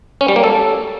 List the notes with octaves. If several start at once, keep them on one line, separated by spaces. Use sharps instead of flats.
C#4
G3
A#3
A4